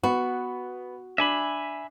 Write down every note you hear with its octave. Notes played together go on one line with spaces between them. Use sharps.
B3 F#4
D4 E5 G#5 B5